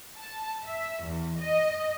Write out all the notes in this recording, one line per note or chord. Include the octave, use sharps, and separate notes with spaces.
A5
E5
E2
D#5